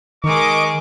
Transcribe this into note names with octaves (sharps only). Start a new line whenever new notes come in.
D#3 G#3 A#4 D#5 C#6 D6